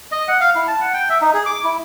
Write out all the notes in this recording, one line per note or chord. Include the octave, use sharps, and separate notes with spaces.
D#5
F#5
F5
E4
A5
F#5
G5
E5
D#4
G#4
D6
E4